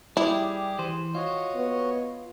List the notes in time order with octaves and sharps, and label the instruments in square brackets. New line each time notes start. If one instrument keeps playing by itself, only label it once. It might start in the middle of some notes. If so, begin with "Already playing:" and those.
[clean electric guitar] G3 [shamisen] E4 [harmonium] G4 G#4
[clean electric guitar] E3 C5
[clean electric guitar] F4 [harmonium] F#4 C#5 D#5
[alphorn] B3